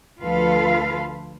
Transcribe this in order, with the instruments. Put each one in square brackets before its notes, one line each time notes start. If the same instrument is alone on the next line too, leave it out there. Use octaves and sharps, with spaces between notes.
[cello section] D2 F3 F4 A4 B4 F5